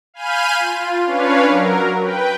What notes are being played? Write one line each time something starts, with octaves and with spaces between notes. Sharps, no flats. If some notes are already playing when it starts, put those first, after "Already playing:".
F5 G#5 B5 F6 G6 D#7
F4
C#4 D4 B4 C#5 F5
F#3 A#4
B4 G5